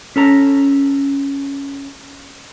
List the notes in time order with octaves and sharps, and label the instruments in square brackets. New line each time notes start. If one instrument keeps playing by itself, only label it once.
[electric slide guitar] C#4 A4 A#5